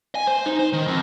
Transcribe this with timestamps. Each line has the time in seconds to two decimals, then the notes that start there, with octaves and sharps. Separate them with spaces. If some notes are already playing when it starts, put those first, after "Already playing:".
0.15 G#5
0.27 C5
0.46 D#4
0.59 C5
0.73 D#3
0.87 F2